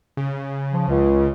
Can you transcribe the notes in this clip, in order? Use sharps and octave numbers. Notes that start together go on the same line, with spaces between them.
C#3
F3
C#2